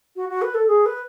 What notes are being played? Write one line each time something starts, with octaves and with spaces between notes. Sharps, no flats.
F#4
F#4
B4
A4
G#4
B4